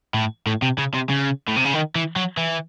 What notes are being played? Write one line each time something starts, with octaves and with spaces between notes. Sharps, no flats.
A2
A2
C3
C#3
C3
C#3
A2
C3
C#3
D#3
E3
F#3
E3